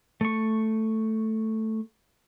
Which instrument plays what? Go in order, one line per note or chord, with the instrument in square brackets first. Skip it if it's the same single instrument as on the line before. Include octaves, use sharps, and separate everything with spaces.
[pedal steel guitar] A3 C#6